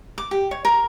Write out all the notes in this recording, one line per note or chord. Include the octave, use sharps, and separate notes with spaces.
D6
G4
C#5
A#4